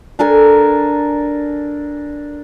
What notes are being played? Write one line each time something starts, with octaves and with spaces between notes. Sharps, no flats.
D4 A4 A#4 G#5